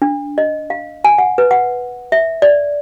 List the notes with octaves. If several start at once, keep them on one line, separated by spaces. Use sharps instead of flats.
D4
D#5
F5
G#5
F#5
B4
F#5
E5
D5